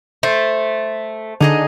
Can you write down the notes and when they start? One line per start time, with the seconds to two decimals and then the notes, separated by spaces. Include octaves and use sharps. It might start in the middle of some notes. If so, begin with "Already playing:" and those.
0.23 A3 C5
1.40 D3 D#4 G#4 D#5